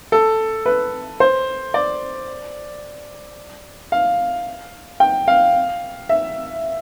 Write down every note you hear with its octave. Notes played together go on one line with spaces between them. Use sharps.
A4
B4
C5
D5
F5
G5
F5
E5